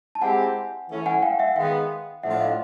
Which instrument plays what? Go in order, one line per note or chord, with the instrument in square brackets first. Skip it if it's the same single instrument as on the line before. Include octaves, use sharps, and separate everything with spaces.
[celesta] A5
[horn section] G#3 C4 E4 G4 [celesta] F#5 G#5
[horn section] E3 A3 C#4 E4
[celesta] F#5 G#5
F5 G5
E5 F#5
[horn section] D#3 G#3 B3 [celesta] F5 G5
[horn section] A2 F3 A3 D4 F4 [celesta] E5 F#5
[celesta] D#5 F5